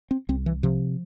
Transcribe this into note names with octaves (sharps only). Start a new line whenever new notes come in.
C4
C2 C4
E3
C3 F3